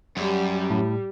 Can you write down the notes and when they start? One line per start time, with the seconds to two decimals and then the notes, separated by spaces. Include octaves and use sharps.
0.17 F#2 G3
0.70 A2